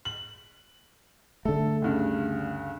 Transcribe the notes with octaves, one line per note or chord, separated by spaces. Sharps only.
F#7
D3 A3 A4
D2 G2 C#3